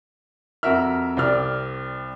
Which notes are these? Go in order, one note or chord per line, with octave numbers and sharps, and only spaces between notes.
F2 F#4 A#4 E5 F6
C2 C4 D5 F6